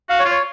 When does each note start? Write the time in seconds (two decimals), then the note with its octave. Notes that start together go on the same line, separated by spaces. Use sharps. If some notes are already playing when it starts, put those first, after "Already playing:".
0.09 F#4 F5
0.20 C#5
0.25 F4
0.31 C#5